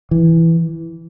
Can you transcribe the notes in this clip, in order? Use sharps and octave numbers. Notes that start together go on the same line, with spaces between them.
E3